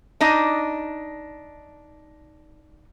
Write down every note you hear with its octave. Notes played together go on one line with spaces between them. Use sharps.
D4 D#4 D#5